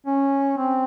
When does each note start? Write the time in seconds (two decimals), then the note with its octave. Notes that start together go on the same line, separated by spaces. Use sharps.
0.06 C#4
0.57 C4